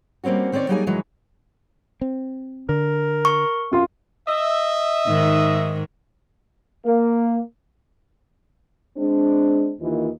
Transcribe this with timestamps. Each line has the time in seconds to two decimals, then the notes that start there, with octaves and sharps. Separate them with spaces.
0.24 G3 A#3 C4 C#4 F#4
0.52 D#3 C4 C#4 C#5 D5
0.68 F#3 G3 A#3 D#4 G#4 G#5
0.86 F#2 D#3 E3 F#3 G#3
2.01 C4
2.69 D3 A#4
3.25 C#6
3.72 F#2 F4 C6
4.28 D#5 E5
5.07 G#2 D#3
6.86 A#3
8.97 G#3 C4 D4
9.80 D#2 E3 A#3 F4 D#5